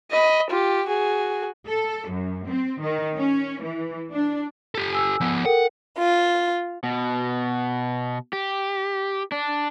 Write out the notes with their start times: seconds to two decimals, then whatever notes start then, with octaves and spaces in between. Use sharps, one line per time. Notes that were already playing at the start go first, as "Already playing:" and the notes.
0.12 D#5 B5
0.50 F4 G4
0.87 F#4 G#4
1.68 A4
2.08 F#2
2.46 C4
2.80 D#3
3.17 C#4
3.62 E3
4.12 D4
4.75 G4 A4
4.92 G#5 E6
5.21 F3 B3
5.45 A4 A#4 F#5 G5
5.98 F4
6.84 B2
8.33 G4
9.32 D4